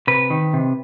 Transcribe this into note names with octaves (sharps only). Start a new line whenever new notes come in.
C3 B4
D#3
C3